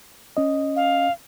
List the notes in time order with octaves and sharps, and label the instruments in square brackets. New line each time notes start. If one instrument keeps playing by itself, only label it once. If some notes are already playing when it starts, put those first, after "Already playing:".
[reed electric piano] C#4 D#5
[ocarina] F5